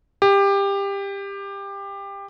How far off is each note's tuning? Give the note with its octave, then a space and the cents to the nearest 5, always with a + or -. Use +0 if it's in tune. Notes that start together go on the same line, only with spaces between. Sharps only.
G4 +20